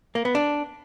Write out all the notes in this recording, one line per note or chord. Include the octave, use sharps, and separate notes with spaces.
A#3
B3
D4